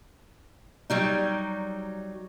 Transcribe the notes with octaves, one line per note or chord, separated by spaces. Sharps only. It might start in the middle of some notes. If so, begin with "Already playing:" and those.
F#3 G3 D#4